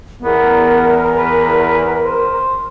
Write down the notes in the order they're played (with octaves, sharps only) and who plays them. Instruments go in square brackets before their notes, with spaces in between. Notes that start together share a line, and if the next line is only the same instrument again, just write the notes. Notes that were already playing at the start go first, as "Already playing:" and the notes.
[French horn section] E2 [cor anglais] B3 [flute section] A#4
[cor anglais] B4
C5